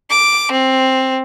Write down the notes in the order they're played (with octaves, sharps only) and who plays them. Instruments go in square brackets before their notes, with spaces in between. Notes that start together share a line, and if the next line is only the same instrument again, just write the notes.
[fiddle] D6
C4